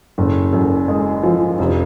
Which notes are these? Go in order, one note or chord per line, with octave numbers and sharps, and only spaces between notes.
F#1
F#2
G#3
F3
F1